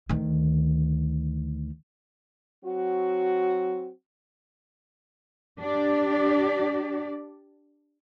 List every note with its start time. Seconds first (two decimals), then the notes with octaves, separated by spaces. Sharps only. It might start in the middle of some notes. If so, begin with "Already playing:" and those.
0.09 D2 D#3
2.64 F#3 C4 F#4
5.59 D4 G4 D5